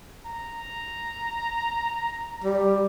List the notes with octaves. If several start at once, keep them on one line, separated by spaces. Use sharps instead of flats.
A#5
G3